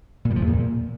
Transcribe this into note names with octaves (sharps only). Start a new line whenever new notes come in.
A#2
G3
F3
E2
A#2